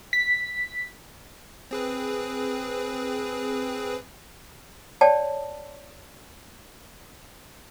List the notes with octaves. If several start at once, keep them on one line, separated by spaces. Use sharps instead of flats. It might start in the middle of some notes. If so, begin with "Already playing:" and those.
B6
C4 G#4 B4
C#5 D5 G5 A5